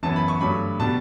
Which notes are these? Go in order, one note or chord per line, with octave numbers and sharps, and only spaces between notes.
F#2 E3 B3 A5
B5
C#6
G2 F#3 A3 B5
B2 G3 B3 A5